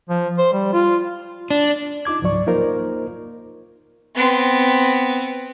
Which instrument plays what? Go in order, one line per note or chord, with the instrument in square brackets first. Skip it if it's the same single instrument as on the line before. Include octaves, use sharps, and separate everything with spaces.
[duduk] F3
C5
G3
F4
[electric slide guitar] D4
[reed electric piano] D#4 F4 D6 G#6
C#2 G#2 F3 F#3 D5 C#6
A#3 D#4 F4 A#4 C5
[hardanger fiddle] B3 C4